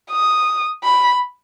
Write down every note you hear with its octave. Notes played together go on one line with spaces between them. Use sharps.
D#6
B5